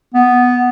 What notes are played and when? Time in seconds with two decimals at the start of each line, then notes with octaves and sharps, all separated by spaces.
0.15 B3